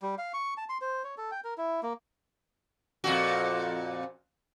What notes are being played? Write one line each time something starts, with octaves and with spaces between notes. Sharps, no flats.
G3
F5
C#6
A5
C6
C5
C#5
A4
G5
A#4
E4
A#3
F2 A#2 F#4